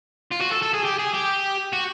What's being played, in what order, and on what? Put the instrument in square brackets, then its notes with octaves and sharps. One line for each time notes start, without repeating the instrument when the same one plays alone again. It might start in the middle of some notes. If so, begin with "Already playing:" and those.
[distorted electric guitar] F4
F#4
A4
A4
G#4
G4
G#4
G4
F#4